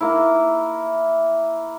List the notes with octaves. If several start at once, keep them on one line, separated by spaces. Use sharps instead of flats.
A#3 E4